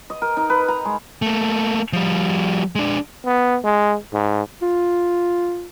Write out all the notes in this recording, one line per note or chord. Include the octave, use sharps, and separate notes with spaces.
D#5
A#4
D#4
B4
A#5
G#3
A3 A#3
F3 G3
G#3 D4
B3
G#3
G#2
F4